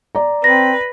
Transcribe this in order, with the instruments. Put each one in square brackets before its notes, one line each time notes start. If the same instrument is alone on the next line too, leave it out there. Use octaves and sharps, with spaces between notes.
[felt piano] D5 A#5
[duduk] C4 [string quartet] B4 [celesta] A#6